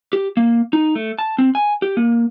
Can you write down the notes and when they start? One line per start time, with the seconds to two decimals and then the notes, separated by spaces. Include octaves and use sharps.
0.13 G4
0.37 A#3
0.73 D#4
0.95 A3
1.19 A5
1.38 C4
1.55 G#5
1.82 G4
1.97 A#3